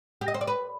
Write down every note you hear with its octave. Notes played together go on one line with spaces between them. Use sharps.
G4
D#5
C5
D5
B4